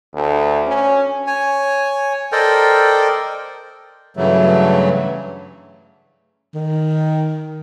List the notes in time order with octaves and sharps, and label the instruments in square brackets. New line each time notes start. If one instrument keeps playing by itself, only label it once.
[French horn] D2
C#4
[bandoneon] C#5 G#5
A4 A#4 C5 D5 D#5 G5
[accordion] G2 C#3 E3 F#3 A3
[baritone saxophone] D#3